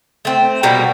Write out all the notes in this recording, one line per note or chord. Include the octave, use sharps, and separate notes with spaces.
A3 C4
B2 G3 A#3 F#4